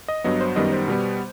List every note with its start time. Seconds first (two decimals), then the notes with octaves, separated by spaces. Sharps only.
0.08 D#5
0.24 G2 F#3 B3 D#5
0.41 C5
0.56 F#2 D#3 G3 B3 D#5
0.72 C5
0.88 B2 G3 B3